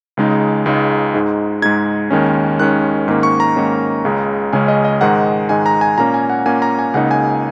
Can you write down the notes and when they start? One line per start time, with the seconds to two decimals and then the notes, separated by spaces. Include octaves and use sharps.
0.17 C#2 C#3 G#3 D#4
0.66 C#2 C#3 G#3 D#4
1.14 G#2 G#3 D#4
1.62 G#2 G#3 D#4 G#6
2.10 D#2 D#3 G#3 C#4
2.59 D#2 D#3 G#3 C#4 F#6
3.08 G#2 D#3 A#3 C#4
3.23 C#6
3.40 A#5
3.56 G#2 D#3 A#3 C#4
4.05 C#2 C#3 G#3 C#4
4.53 C#2 C#3 G#3 C#4 G#5
4.68 D#5
4.85 D#5
5.01 G#2 D#3 G#3 D#4 F#5
5.49 G#2 D#3 G#3 D#4 G#5
5.66 A#5
5.81 G#5
5.97 A#2 A#3 C#4 A#5
6.14 G#5
6.30 F#5
6.46 A#2 A#3 C#4 G#5
6.62 A#5
6.79 G#5
6.94 C#2 C#3 A#3 D#4 F#5
7.11 G#5